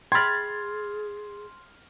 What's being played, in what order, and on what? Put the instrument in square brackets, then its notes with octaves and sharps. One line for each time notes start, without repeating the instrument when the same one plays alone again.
[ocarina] G#4 [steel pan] G5 B5 [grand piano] C6 F6 [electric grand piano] G#6 A6